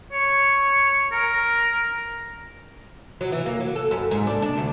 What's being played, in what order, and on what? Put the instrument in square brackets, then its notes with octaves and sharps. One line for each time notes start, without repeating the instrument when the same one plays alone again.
[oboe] C#5
A#4
[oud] F#3
E3
A#3
F#3
A4
F#2
G#2
D4
D4
D2